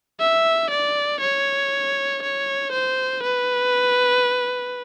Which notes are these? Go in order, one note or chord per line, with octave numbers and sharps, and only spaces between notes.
E5
D5
C#5
C#5
C5
B4